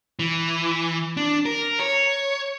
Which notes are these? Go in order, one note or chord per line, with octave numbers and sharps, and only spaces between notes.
E3
D4
A#4
C#5